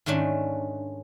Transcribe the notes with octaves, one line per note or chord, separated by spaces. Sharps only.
G#2 D#3 A3 C#4 D4